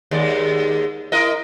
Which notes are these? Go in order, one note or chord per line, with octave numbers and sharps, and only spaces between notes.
D#2 G#3 D5
E4 A#4 D#5